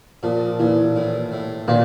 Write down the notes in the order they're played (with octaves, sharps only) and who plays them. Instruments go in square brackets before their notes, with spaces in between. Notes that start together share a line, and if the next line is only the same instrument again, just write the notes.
[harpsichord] A#2 [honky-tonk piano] F3
[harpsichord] A#2 [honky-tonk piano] E3
[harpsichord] A2
A2
[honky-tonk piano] A#2 [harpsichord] D4